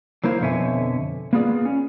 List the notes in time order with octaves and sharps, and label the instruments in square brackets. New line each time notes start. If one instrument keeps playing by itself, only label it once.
[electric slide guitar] F#3 A#3 E4 C5 F5
F2 B2 D3 C#5 E5 G#5
A#3 B3 F4 G#4 D5
C#4